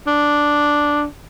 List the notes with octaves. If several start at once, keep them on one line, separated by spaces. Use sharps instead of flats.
D4